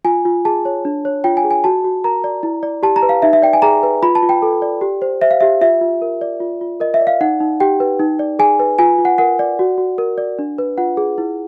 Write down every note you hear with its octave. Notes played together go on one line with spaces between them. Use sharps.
F4 G#5
F4
G#4 A5
C#5
D4
C#5
F4 G5
G#5
G#4
G#5
F#4 A5
F#4
A#4 A#5
D5
E4
D5
G4 A5
A#5
B4
F5
D#4 E5
E5
D5 G5
G#5
G#4 A#5
B4
F4 B5
A5
F4
G5
A4
D5
G4
C5
C5 E5
F5
G4 E5
F4 E5
F4
A#4
D5
F4
F4
A#4 D#5
E5
D5
F5
D#4 F#5
D#4
G4 G5
B4
D#4
D5
G#4 G#5
B4
F4 G#5
F4
F#5
A#4 F#5
D5
F#4
F#4
A#4
D5
D4
B4
F4 F#5
G#4
E4